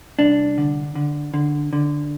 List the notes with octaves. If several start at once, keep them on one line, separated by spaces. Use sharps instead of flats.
C2 D4
D3
D3
D3
D3